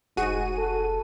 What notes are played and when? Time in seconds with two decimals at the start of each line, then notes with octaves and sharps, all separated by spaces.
0.17 F1 G#2 F#4 G#4 D#7
0.58 A4